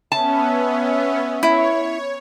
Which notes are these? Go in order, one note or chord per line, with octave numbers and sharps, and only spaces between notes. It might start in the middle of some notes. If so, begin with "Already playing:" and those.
B3 C#4 E5 A5
E4 C#5